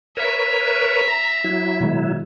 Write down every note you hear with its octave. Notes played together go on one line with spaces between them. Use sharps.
A#4 B4 C#5 E5
A#5
F#3 E4
B2 D#3 G#3